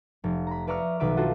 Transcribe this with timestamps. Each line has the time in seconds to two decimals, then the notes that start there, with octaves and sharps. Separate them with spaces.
0.24 F1
0.47 A#5 B5
0.67 B4 D5 E5 A#5 C#6 F6
1.00 B1 D#3 B4 E5 D6
1.17 D4 F4 F#4 A4